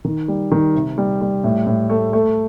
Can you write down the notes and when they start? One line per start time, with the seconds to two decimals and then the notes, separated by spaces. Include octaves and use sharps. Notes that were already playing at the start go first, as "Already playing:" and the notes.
0.05 D#3
0.28 G3
0.52 D#3
0.75 C3
0.98 G3
1.21 G3
1.44 A2
1.67 A2
1.90 A3
2.13 A3